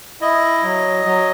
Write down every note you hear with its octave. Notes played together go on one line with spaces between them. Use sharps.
E4 D#5
F#3
F#3